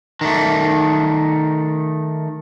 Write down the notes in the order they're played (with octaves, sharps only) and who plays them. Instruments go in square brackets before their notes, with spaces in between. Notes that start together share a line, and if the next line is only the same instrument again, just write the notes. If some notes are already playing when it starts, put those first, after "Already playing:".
[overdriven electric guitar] D#3 A3